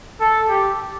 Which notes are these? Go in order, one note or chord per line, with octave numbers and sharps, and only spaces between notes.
A4
G4